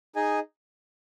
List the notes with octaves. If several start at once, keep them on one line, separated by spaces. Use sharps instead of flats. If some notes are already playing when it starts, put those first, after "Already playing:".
D#4 G#4 D#5 G#5